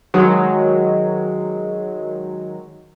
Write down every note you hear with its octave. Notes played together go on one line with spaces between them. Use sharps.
D#3 F#3 G#3